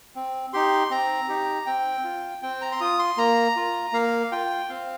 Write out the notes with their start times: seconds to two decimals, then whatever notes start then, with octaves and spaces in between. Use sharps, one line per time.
0.16 C4
0.53 D#4 G4 C6
0.90 C4 A#5
1.28 D#4 G4
1.66 C4 G5
2.04 F4
2.42 C4 G5
2.62 A#5
2.72 C6
2.81 F4 D#6
2.99 C6
3.17 A#3 A#5
3.56 F4
3.93 A#3 F5
4.32 F4 G5
4.69 C4 F5